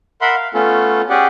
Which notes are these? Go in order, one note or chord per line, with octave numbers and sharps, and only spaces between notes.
A#4 E5 F#5 B5 C6
F5
A3 B3 C#4 F4 A4
C#4 G4 G#4 D5 F#5